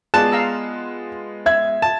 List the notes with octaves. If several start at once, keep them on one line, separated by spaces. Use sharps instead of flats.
G#3 B3 F4 G#4 D5 A5 F#6 E7
F5 A#5 E6
E5 G#6
A5